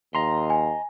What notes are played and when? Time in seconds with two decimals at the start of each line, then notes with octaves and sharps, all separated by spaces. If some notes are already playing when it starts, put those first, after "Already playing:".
0.15 D#2 D#5 A#5 C6
0.50 G#5